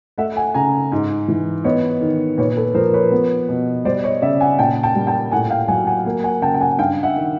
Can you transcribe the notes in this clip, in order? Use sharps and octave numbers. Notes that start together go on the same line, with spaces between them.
A3 E5 F#5
F#5 G#5
C#3 G#5 A#5
G#2
E3
B3 C#5 D#5
D#3
A#2 B4 C#5
A4 B4
F3 A#4 C5
B4 C#5
B3
B2
G3 C5 D5
C#5 D#5
C#3 D5 E5
F#5 G#5
A#2 G5 A5
G5 A5
G3
G5 A5
A2 F#5 G#5
F5 G5
F#3 F#5 G#5
F#5 G#5
A#3
F#5 G#5
C#3 G5 A5
G5
F#5 G#5
G2 F5 G5
E5 F#5
D#3